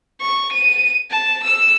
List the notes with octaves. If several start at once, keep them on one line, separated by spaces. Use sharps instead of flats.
C#6
D#7
A5
E6